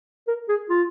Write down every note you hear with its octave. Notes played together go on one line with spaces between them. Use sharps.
A#4
G#4
F4